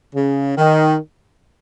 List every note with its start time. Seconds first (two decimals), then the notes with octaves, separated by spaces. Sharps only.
0.14 C#3
0.57 D#3